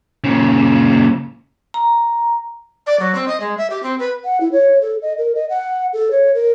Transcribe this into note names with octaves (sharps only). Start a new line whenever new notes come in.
A#2 C#3
A#5
D5
F#3
C4
D#5
G#3
E5
G4
C4
B4
F#5
E4
C#5
A4
D#5
A#4
D#5
F#5
A4
C#5
A#4